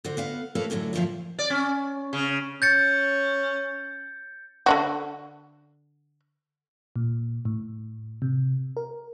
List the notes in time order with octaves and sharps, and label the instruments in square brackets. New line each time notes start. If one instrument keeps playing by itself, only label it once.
[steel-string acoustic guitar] D3 F#4 C5
B3 F5 F#5
A3 A#3 C#4 A4 B4 F5
F#2 A2 D3 E3 F#3
D2 G2 A#2 F3 E5 F5
[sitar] D5
C#4
C#3
[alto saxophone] C#4 [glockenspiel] G6 A6 C#7
[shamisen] D3 D4 F#4
[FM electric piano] A#2
A2
C3
A#4